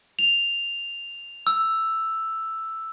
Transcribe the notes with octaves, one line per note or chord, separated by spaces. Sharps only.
F7
E6